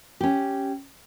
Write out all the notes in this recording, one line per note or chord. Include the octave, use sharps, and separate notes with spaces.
C#4 G4